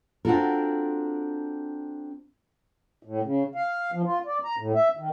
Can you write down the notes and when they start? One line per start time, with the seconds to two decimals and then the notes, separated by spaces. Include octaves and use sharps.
0.25 C4 D4 F4 F#4 A4 A#4
3.03 A2
3.23 C#3
3.55 F5
3.92 F3
4.05 F4
4.26 D5
4.44 A#5
4.57 A2
4.75 E5
4.97 D#3